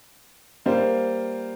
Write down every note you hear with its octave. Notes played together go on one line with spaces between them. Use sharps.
G3 A#3 F4 C5